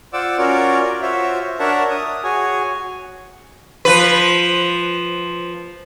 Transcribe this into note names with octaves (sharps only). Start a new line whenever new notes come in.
F4 C5 D5 F#5 D6 E6
C#4 F4 F#4 A#4 C#5 D5
F4 F#4 C5 C#5 E5
D4 A#4 C#5 E5 F#5 A5
D#6
F#4 G#4 C#5 G#5
F3 B4